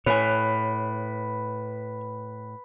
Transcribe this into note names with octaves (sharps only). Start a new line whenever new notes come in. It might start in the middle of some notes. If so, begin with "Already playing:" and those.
A2 B4 C#5 G#5